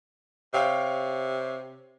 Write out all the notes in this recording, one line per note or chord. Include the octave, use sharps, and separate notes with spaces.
C3 C#5 F5 G5